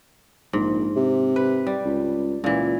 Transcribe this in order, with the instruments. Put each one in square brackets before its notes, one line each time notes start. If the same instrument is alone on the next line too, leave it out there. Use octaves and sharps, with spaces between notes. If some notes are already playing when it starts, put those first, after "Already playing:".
[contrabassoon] A#1 [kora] G#2
[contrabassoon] C3
[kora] B4
G3
[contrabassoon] C#2
[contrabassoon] C#2 [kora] A#2 E3